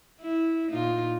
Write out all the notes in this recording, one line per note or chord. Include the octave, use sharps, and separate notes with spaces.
E4
A#2 D#4 F4